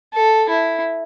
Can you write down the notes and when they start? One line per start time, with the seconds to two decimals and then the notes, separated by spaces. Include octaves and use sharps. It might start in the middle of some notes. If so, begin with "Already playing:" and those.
0.13 A4
0.49 E4